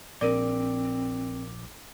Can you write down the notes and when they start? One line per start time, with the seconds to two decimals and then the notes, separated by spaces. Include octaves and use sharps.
0.21 A#1 C4 A#4 D5 D6